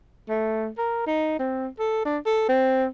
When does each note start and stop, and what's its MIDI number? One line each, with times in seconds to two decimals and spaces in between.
0.29 0.68 57
0.78 1.03 70
1.07 1.37 63
1.39 1.68 60
1.79 2.03 69
2.05 2.18 62
2.26 2.47 69
2.49 2.86 60